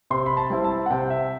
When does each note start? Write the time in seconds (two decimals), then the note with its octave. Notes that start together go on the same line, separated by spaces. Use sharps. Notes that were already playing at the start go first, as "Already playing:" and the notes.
0.10 C3 C6
0.26 B5
0.37 A5
0.50 G3 C4 E4
0.64 A5
0.86 F#5
0.91 C3 G5
1.10 E5